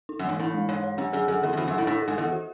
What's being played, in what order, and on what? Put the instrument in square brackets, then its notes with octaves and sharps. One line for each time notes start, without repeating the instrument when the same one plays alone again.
[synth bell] D#4
[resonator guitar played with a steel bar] F#2
[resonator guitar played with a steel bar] G#2 [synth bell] E3
[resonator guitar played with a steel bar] A2 [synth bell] D#4
[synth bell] G#3
[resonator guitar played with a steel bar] G#2 [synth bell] C#5
[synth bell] C#5
[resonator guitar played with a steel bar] F#2 [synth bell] C#4
[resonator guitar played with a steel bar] F#2 [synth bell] G#4
[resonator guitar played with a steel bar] F#2 [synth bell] A4
[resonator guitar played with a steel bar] E2 [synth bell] A4
[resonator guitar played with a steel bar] F#2
[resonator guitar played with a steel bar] E2 [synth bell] F#4
[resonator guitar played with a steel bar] F#2
[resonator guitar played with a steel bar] A2 [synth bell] A4
[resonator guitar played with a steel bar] A2 [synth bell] D#4
[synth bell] A4
[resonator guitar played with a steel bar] G#2
[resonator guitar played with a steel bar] E2 [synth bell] A4
[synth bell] F#4